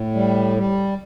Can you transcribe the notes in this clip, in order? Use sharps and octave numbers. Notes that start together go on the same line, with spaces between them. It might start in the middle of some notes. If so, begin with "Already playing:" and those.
Already playing: A2
G3
G3